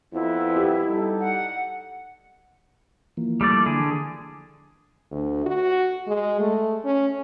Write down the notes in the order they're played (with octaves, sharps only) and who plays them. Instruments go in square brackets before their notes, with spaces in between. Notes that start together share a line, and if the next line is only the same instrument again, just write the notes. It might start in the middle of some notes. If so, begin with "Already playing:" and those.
[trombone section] F2 B3 [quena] E4
[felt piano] G4
[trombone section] G3 D#4 A4
[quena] F#5
[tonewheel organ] E3 F3 A#3
[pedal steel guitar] G3 A3 D5
D3 G#4
[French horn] D2
F#4
G#3
A3
C#4